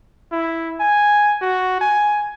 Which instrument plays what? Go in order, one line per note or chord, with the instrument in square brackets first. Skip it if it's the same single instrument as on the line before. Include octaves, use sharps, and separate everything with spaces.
[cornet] E4
G#5
F#4
G#5